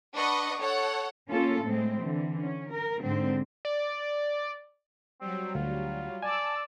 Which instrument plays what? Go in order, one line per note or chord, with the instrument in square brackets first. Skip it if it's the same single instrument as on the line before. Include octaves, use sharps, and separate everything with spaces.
[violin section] D4 B4 D#5 F#5 C#6 D#6
A4 C#5 F#5
[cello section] A#3 C#4 F4 A4
A2 G#3 C4
D3 E3
C#4
A#4
G#2 D3 C4
[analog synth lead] D5
[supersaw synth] F#3 G3 [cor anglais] C4
[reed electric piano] D2 [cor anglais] F4
[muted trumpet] D5 [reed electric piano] G#5 [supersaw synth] A5 E6